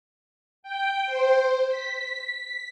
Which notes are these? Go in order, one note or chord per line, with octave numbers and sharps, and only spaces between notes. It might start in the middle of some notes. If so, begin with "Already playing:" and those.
G5
C5
B6